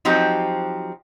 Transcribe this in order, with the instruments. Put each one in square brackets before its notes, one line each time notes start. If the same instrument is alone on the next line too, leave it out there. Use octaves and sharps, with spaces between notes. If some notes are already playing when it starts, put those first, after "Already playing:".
[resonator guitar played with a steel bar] F3 F#3 C4 D#4 G4